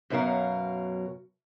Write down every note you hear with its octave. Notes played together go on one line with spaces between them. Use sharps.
F#2 B2 F#3 A#4 F5